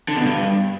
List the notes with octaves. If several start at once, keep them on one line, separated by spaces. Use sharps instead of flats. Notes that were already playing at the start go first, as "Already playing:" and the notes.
D3
B2
G2